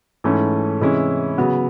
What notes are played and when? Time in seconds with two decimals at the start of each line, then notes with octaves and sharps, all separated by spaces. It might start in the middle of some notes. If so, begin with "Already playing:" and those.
0.24 G#2 E3 A3 C#4
0.80 C3 E3 G#3 C#4 E4
1.38 C#3 F#3 B3